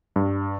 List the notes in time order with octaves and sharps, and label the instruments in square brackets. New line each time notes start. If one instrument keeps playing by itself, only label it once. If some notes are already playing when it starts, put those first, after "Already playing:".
[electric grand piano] G2